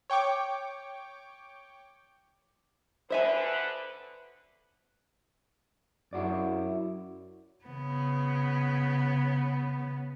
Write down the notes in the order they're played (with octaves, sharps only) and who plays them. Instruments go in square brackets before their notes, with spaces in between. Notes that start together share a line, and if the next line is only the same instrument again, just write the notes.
[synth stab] C#5 G5 C#6 D6
[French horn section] D2 D3 B4 [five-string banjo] C5 E5 G#5
[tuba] F#2 [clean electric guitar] E4 F#4 D5
[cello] C#3 B3